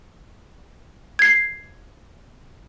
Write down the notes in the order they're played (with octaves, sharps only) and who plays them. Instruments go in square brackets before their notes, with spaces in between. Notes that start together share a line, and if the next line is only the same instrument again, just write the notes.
[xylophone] G#6 C7